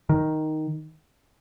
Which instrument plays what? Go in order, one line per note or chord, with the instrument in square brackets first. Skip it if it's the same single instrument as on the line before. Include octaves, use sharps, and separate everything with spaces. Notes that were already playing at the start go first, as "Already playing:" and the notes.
[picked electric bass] D#3